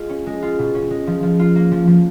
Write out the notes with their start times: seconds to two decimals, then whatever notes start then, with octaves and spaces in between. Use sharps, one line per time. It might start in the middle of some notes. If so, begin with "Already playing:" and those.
Already playing: G#3 F4
0.09 C#4
0.26 G#3
0.42 F4
0.59 B2
0.75 C#4
0.90 G#3
1.07 F3
1.23 F3
1.39 F4
1.56 A#3
1.72 F3
1.87 F3